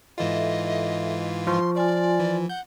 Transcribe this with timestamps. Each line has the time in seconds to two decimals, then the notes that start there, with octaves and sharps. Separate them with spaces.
0.18 G#2 E3 F4 A4 D#5 E5
1.47 F3 C6 C#6
1.75 F4 D5 G#5 C6
2.20 E3
2.49 F#5 G6